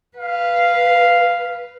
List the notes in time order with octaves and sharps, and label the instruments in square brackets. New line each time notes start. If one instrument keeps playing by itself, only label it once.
[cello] B4 [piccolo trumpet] F5